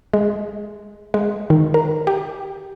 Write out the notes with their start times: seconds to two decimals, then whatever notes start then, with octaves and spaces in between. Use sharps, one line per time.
0.13 G#3
1.14 G#3
1.50 D#3
1.74 A#4
2.07 G4